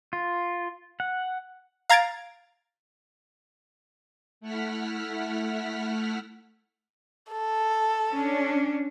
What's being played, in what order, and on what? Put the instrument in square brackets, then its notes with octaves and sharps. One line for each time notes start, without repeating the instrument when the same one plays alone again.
[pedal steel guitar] F4
F#5
[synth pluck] F5 A#5 G#6 A6 D7
[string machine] A3 E4 F#5 F6 B6
[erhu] A4
[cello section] C#4 D4